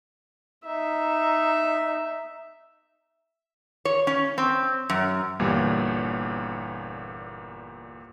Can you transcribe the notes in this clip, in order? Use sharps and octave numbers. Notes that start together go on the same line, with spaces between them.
D#4 E5
C#5
C#4
C4
F#2
G1 E2 A#2 G3